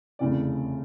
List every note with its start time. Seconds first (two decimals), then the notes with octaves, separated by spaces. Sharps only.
0.19 F1 E2 C#3 E3 D5